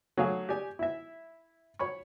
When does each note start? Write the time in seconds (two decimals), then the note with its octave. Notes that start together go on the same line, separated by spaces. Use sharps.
0.17 F#3 A3 G#4 F5
0.49 G4 G#4 D5 G#5
0.79 E4 E5
1.79 C#5 B5 C#6